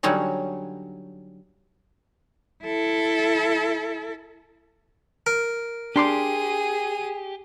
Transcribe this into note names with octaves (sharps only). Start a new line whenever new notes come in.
D3 F#3 G3 C#4 D#4
E4 A4
A#4
D4 G4 G#4 C6 D6 D#7